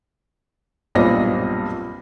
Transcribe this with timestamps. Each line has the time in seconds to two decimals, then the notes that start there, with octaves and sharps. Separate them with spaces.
0.95 B1 G2 A#2 C4 D#5 A#6